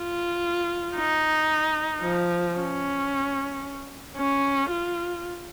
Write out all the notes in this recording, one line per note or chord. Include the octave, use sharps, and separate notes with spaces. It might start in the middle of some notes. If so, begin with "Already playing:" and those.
Already playing: F4
D#4
F3
C#4
C#4
F4